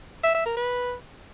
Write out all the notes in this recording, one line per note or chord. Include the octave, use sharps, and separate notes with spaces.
E5
E5
A#4
B4